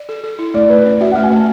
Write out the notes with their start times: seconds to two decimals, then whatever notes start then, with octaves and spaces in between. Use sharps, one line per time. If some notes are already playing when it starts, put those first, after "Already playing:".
Already playing: D5
0.09 A4
0.24 A4
0.39 E4
0.54 A3 D5
0.69 A3 B4
0.85 C#4 D5
1.00 F#4 E5
1.12 F#5
1.15 A3
1.23 G#5
1.31 A3 A5